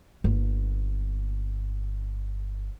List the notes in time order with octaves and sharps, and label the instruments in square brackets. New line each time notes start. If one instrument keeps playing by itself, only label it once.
[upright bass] G1 A#3